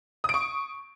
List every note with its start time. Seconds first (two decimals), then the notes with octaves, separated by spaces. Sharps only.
0.24 D#6
0.29 D7
0.34 C#6